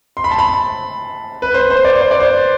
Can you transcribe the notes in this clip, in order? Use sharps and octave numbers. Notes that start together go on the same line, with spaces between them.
C6
B5
A5
B5
B4
C5
C5
D5
C5
D5
C5